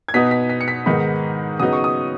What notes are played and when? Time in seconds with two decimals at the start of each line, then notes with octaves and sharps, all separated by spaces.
0.08 G#6
0.14 B2 B3 D#4 B6
0.31 B6
0.50 B6
0.61 C#7
0.68 B6
0.86 G#2 D#3 B3 D#4 B5
1.60 C#3 F#3 B3 D#4 D#6
1.73 C#6
1.84 D#6